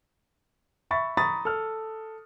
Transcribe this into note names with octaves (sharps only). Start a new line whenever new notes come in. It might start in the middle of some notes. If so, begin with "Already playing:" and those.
E5 B5 C#6 A6
A#5 B5 C#6 D#6 A6
A4 F6